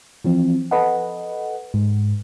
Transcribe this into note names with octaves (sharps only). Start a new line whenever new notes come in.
E3 F3 C4
A4 B4 D#5 F#5
G#2